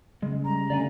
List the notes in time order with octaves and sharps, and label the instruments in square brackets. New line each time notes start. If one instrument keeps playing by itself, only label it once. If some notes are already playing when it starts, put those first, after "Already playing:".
[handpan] C#3 [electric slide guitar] G#3
[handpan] G3 [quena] A#5
[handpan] D3 A3 C#4 [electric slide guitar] D5 F5 G#5